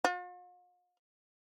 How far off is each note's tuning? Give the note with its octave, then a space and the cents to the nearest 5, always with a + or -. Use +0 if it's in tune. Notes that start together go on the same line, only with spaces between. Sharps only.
F4 +45